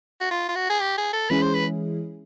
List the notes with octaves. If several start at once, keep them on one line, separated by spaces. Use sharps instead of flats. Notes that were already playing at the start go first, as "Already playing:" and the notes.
F#4
F4
F4
F#4
G#4
G4
G#4
A4
E3 G#3 C#4 E4 G#4 B4
C5
B4